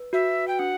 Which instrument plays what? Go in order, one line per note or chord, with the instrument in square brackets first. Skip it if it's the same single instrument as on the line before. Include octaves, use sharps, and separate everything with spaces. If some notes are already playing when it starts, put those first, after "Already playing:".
Already playing: [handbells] B4
[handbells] F#4 [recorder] E5
[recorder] G5
[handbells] D4 [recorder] F#5